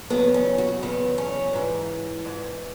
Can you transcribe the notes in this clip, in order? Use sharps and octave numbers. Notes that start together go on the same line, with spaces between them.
E2 C#3 F#3 B3
C#4
F#4
E2 C#3 F#3 B3
C#4
G#2 E3
G#2 E3